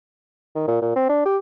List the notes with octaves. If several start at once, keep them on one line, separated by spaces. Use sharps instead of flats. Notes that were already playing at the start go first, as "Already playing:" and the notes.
D#3
A#2
A#2
C4
D4
G4